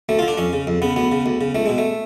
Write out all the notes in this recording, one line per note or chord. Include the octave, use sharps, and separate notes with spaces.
D2 A3
D3 F4
D4
F2 C#4
C#3
F2
C#3 B3
D2 B3
C#3
D2
C#3
C#2 A3
B2 G#3
A3